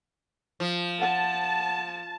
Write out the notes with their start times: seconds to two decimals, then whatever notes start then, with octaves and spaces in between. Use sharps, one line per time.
0.60 F3
1.02 F#5 A5